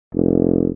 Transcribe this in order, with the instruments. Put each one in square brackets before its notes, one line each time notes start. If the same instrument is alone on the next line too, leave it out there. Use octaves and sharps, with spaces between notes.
[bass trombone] F1